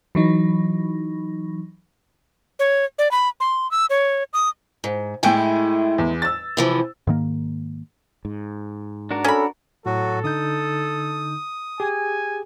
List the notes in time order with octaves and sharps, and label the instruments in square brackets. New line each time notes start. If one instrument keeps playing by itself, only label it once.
[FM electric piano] E3 F#3 D#4
[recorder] C#5
D5
B5
C6
E6
C#5
D#6
[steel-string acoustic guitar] G#2
[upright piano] A2 G5 G#5 [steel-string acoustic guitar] G#3 A3 E4
[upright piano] E2
E6 A6
[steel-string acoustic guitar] C3 E3 F3
[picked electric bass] G#2 D#3 A#3
[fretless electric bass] G#2
[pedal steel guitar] D4 F#4 A#4
[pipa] C#4 B5 [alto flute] A4
[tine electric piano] A2 [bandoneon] F#3 F#4 [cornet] A4
[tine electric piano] D3 D#4 G6 [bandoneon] D#6
[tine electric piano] G4 G#4 [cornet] G#5